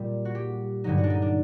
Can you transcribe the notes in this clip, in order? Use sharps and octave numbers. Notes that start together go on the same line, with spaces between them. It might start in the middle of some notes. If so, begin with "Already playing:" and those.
Already playing: A#2 G3
F#4
G4
G2 D3 F#3 D#4
F#4
D4
D#4
D4